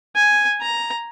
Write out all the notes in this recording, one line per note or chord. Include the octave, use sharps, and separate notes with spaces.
G#5
A#5